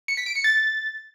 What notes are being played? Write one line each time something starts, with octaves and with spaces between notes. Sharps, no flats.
C#7
B6
D7
C#7
A6